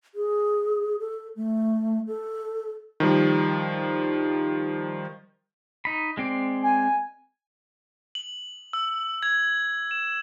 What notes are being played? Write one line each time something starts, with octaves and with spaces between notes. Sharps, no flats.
G#4
A4
A3
A4
D#3 F3 G3
D#4 B5
G#3 C4 D5
G#5
F#7
E6
G#6
E7